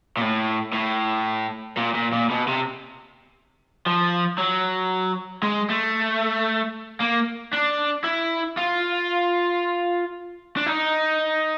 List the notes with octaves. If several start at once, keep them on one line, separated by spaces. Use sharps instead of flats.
A#2
A2
A2
A#2
A#2
A#2
B2
C3
F3
F#3
G#3
A3
A#3
D4
E4
F4
D4
D#4